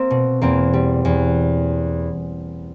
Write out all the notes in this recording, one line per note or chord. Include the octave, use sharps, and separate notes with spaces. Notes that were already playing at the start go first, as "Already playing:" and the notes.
Already playing: A#3 C4
B2
E2 A#3 C4
G3
E2